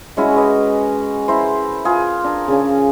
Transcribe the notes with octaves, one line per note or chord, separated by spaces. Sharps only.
G#3 C#4 E4 F#4
B4 D#5
E4 A#4 C5
F4 G#4
D4 A#4
C#3 C#4